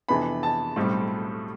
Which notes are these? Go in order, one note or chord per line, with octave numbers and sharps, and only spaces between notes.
F2 C3 E3 B3 D4 B5
A5
B1 A2 G3 C4